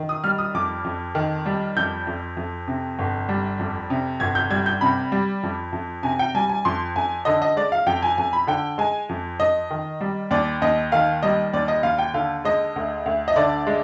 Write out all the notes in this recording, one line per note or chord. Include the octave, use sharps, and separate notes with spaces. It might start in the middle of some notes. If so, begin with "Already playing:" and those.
Already playing: D#3
D#6
G3 F6
D#6
F2 D6
F2
D#3
G3
F2 G6
F2
F2
C3
G1
G3
F2
C3
G1 G#6
G6
G3 G#6
G6
C3 B5
G3
F2
F2
C3 G#5
G5
G3 G#5
G#5
F2 C6
F2 G#5
D3 D#5
D#5
G#3 D5
F5
F2 G5
G#5
F2 G#5
B5
D3 G5
G#3 G#5
F2
F2 D#5
D#3
G3
D#2 D5
D#2 D#5
D#3 F5
G3 D#5
D#2 D5
D#5
D#2 F5
G5
D3 F5
G#3 D#5
D2
D2
D#5
D3 D5
G#3